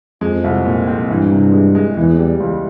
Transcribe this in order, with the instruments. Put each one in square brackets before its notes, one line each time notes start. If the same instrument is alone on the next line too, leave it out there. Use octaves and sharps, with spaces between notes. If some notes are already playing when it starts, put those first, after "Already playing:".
[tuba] F2 [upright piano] G#3
[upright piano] C2
A#2
C4
[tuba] G2 [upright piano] E3
[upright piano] C3
G#3
G#3
[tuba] E2 [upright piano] E3
[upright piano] G3
C#2